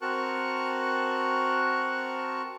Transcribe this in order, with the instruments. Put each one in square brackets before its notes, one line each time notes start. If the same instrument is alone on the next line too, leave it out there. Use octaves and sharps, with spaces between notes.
[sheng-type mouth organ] C4 F#4 A#4 A5 C#6 F#6